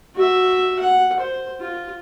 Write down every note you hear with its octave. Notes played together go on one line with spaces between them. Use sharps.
F#4 E5
F#5
C5
F4